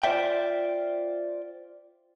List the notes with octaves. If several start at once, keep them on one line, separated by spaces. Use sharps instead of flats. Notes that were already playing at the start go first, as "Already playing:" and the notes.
F4 C5 D5 E5 G5